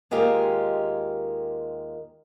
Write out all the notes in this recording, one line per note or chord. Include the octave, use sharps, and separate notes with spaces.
D#2 G#3 F4 G4 A#4